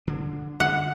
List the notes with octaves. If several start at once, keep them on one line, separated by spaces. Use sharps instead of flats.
D3 D4
D3 F#5